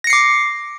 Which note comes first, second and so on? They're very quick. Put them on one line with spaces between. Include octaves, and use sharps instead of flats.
A#6 C#7 C7 D6